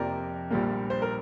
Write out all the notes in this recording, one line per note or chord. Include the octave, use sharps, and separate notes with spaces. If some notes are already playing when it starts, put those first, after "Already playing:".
Already playing: F2 C3 F3 A#3 A#4 D5
A#1 A#2 G3 A#3
C5
A#4